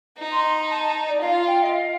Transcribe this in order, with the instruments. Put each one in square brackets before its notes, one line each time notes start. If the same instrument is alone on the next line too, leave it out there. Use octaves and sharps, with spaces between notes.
[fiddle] D#4
[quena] C6
C6
A#5
A5
A5
D5
[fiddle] F4 [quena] F5
[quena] G5
D#5
F5